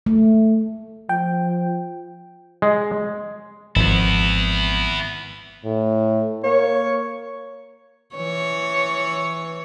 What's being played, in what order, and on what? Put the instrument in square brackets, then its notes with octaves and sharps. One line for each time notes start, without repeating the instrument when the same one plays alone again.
[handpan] A3
[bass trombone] F3 [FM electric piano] G5
[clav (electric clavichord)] G#3
[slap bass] G#1 F3 [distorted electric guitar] B3 E4
[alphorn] A2
[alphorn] A#3 [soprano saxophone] C#5
[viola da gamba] E3 C#5